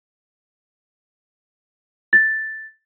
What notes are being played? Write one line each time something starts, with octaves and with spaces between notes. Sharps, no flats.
A6